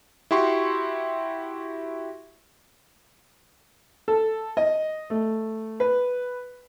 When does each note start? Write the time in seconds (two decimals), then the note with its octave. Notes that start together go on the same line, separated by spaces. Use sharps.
0.31 E4 F#4 G4 C6 C#6
4.08 A4
4.57 D#5
5.10 A3
5.80 B4